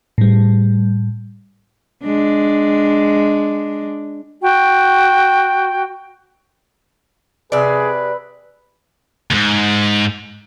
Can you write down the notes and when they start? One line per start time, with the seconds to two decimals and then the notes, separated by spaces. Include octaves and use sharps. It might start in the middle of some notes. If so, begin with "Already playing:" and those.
0.18 A2 G3
2.03 G#3 D4
4.42 F#4 G5
7.52 C3 G#4 B4 D5
9.31 D#2 G#2